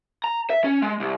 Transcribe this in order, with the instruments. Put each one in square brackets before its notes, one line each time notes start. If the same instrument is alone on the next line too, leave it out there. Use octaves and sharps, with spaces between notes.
[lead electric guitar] A#5
E5
C#4
G#3
C2